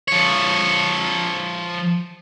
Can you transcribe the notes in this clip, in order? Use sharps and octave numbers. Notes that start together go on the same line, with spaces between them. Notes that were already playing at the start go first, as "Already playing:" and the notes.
F3 C#5